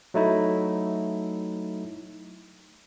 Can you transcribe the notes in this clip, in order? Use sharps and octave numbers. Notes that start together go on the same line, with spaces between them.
F#3 A3 D#4 E4